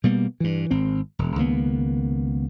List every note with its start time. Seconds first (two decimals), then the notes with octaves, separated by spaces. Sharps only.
0.04 B2 G3 A#3 B3
0.40 G2 E3
0.71 G#1 C4
1.19 E1
1.36 C#2 D#3 A#3 B3